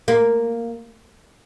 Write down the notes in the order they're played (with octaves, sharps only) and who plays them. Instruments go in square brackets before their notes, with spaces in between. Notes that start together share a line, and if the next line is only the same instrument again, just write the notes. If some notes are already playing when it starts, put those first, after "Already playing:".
[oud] A#3